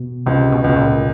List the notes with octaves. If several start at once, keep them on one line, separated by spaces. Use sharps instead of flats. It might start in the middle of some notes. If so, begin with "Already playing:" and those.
Already playing: B2
C#2 C3
B2
C#2
B2
A#2